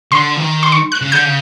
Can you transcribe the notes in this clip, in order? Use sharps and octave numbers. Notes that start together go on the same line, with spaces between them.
D3 C6
E3
D#3
C6
C#6
F#6
C#3
D3 G6
C#3